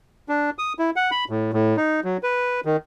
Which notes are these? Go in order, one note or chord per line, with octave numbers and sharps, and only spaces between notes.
D4
D#6
E4
F#5
B5
A2
A2
D#4
F#3
B4
D#3